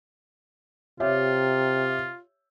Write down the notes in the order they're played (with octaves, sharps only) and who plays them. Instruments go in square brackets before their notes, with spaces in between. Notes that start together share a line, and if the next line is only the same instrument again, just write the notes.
[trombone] C3 [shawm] F4 [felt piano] G4 C#5 E5